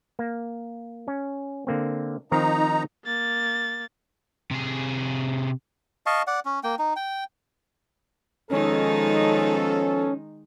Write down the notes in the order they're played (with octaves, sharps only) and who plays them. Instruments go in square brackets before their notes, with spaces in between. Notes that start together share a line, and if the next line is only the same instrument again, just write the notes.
[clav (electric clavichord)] A#3
C#4
D3 A#3 C4
[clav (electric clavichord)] D#3 F3 C4 [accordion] D#4 A#5
[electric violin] A#3 A6
[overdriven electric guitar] C3 G#4
[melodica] D#5 F5 A5 C#6
D5 F#5
C#4
A#3 G5
D#4
G5
[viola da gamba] D#3 G#3 D#4 [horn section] F3 B3 A4 [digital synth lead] C#4